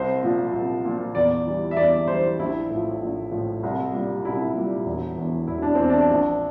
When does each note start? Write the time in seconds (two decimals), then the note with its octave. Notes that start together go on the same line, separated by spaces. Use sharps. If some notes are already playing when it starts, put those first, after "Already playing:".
Already playing: C2 C5
0.23 A#2 F3
0.53 C2
0.85 A#2 F3
1.15 E2 D5
1.47 E3 G3
1.71 E5
1.77 E2 D5
2.08 E3 G3 C5
2.39 A#1 E4
2.70 A2 F3
3.01 A#1
3.31 A2 F3
3.63 C2
3.93 A#2 G3
4.25 C2 E4
4.55 A#2 G3
4.86 E1
5.17 E2 E3
5.48 E1 E4
5.62 D4
5.75 E2 E3 C4
5.89 D4
6.10 A#1